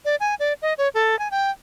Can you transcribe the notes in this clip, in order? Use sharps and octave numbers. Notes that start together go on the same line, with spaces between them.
D5
G#5
D5
D#5
C#5
A4
G#5
G5